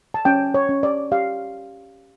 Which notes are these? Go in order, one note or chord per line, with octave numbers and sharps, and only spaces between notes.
A5
C#4 G5
C#5
C#4
D5
G4 F5